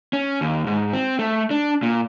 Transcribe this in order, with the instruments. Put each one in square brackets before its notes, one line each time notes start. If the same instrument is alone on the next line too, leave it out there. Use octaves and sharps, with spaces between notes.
[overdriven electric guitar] C#4
D#2
G#2
C4
A3
D4
A#2